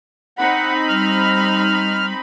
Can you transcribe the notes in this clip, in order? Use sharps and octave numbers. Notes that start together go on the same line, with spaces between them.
C4 D#4 F#5 B5
G3 F6